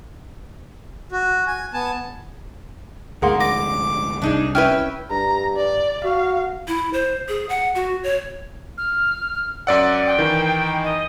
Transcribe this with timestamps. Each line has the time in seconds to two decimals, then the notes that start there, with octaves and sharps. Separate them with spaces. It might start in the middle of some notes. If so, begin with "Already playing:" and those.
1.12 F#4
1.47 G#5
1.74 B3 G#5 A5
3.22 D2 G#2 A#3 G#4 F#5 C6
3.41 D6 A#6
4.22 C2 D4 D#4 G#4
4.55 C#4 E4 B4 G5 F6
5.11 G2 A#5
5.57 D5
6.05 F#4 F5
6.68 E4
6.93 C5
7.28 G#4
7.49 F#5
7.75 F#4
8.04 C#5
8.78 F6
9.67 F#2 D5 F#5 E6
10.07 G5
10.19 D#3 E3 D#4
10.84 D#5